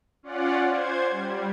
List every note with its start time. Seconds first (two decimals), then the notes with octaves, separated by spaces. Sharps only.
0.23 C#4 F4 D5 F#5
0.68 C5 G#6
1.11 G3